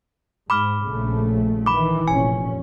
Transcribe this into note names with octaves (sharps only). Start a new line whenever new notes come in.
G#2 B5 D6 F6
A#1 C#3 A3
D#3 E3 B5 D6
F1 A#2 C#4 G#5